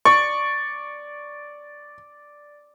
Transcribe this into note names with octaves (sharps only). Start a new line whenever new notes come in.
D5 C#6